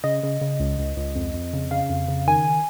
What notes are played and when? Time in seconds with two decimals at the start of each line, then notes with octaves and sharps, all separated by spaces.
0.04 C#3 D#5
0.23 C#3
0.41 C#3
0.60 C#2
0.79 C#2
0.97 C#2
1.16 F2
1.34 F2
1.53 C#3
1.71 C#3 F5
1.90 F2
2.08 C#3
2.27 D#3 G#5